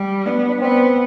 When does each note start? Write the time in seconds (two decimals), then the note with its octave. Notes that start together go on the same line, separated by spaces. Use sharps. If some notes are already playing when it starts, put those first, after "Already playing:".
Already playing: G3
0.26 B3 D4
0.49 D4
0.61 B3 C4